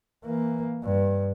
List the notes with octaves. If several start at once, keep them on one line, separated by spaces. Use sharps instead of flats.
E3 A#3
G2